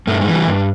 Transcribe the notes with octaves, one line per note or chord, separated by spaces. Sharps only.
G2 A3
G#3
E3
G3
G2